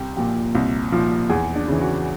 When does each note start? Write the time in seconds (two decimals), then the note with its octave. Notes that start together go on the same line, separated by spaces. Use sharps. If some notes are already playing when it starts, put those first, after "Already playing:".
Already playing: C2 G4
0.17 A#2 F3 G4
0.55 C2
0.92 A#2 F3
1.29 E2 G#4
1.55 D4
1.68 C#3 E3
1.81 F#4